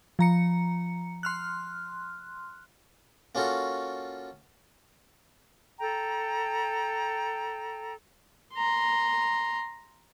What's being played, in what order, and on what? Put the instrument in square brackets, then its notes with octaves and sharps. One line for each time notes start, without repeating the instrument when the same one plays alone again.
[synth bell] F3 A#5 C#7
C6 F6 F#6
[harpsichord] A#3 C#4 F4 F#4 A4
[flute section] A4 G5 A#5
[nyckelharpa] A#5 C6